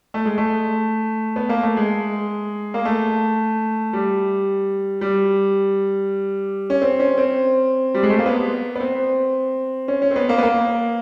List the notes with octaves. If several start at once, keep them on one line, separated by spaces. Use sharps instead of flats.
A3
G#3
A3
B3
A#3
A3
G#3
A#3
A3
G3
G3
C#4
C4
C#4
C4
G3
G#3
A3
A#3
B3
B3
C4
C#4
C#4
C4
B3
A#3
B3
A#3